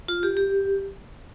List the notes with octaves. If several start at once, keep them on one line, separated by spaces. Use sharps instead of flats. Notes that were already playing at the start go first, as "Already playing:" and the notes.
F4
G4
G4